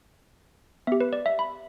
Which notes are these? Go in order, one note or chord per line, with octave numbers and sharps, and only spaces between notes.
B3 G4 E5
B4
D5
E5
B5